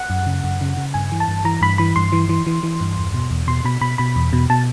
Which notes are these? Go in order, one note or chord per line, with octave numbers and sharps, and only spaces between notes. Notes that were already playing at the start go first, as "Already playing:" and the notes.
Already playing: F#5
F#2
C#3
F#2
C#3
C#3
G2 G#5
E3
A5
G2
E3 A#5
G2 B5
E3 B5
G2 C6
E3
E3
E3
E3
G2
E2
B2
E2
B2 C6
B2 B5
B2 B5
B2 B5
E2
B2
B2 A5